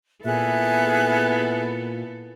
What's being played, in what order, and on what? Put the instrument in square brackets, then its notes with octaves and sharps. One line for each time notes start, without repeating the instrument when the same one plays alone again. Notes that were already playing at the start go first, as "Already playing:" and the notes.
[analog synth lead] A#2 [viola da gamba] B3 E4 A4 [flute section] G#4 E5 F#6